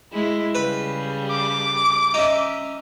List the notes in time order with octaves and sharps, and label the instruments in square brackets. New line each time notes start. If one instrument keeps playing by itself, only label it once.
[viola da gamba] G#3 E4
[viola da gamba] C#3 G3 [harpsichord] B4
[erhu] D6
[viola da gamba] C#4 [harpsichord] D#4 E5